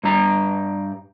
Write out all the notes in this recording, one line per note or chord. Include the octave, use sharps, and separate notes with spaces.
G2 G3 A#5